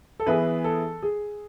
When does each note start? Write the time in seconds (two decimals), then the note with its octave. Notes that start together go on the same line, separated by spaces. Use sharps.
0.20 A4
0.26 E3 B3 E4 G#4 B4
0.64 A4
1.03 G#4